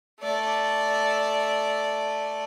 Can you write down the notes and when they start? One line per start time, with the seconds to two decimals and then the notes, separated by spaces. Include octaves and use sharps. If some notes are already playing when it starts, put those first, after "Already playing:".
0.20 A3 D5